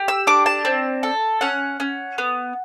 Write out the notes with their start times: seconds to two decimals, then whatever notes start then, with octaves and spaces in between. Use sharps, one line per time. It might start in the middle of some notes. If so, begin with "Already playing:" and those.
Already playing: G4
0.08 E6
0.27 D4 D6
0.46 A5
0.65 C4
1.03 A4
1.41 C#4 F#5
1.80 C#4
2.18 B3